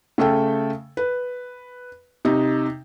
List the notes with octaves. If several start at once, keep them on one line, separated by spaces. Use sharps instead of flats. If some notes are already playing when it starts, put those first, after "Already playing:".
C#3 A3 A4 G5
B4
C3 D#4